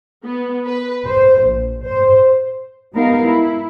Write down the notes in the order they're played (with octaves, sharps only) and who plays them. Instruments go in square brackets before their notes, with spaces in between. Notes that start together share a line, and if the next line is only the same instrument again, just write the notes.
[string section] B3
B4
C5
A#1
C5
[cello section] G3 G#3 B3 D#4 A#4 F5
E4